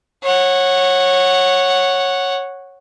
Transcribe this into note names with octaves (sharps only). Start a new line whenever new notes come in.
C#5 F#5